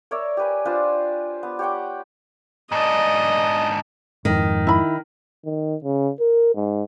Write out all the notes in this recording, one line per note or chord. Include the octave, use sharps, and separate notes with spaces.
A#4 C#5 D5 E5
G4 B4 G#5
D4 F4 B4 C5
B3
G4 C#5 F#5 G5
G#2 D4 D#5
F2 G#2 D#3
E4 B5
D#3
C#3
A#4
G#2